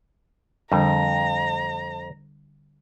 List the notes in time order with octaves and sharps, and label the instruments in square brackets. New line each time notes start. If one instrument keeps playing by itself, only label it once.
[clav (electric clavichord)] F2 [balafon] D3 G3 D4 [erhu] A#5